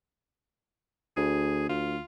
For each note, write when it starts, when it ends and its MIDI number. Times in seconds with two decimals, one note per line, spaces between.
1.17 1.65 38
1.17 1.65 68
1.69 1.98 38
1.69 2.05 65